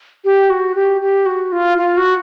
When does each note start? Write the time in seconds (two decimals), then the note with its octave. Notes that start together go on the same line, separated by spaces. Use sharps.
0.25 G4
0.50 F#4
0.75 G4
1.02 G4
1.26 F#4
1.52 F4
1.78 F4
1.97 F#4